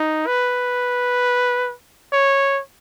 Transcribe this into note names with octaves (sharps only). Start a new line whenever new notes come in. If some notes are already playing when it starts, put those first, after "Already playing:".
Already playing: D#4
B4
C#5